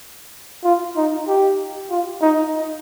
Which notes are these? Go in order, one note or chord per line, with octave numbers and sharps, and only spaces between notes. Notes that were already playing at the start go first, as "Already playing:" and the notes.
F4
D#4
G4
F4
D#4